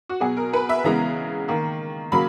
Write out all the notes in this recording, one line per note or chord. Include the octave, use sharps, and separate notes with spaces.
F#4
B2 F#3 B3 G#4
A#4
B4
E5
C#3 E3 G#3 B3 A#5
D#3 A#3
C#3 F#3 A#3 B5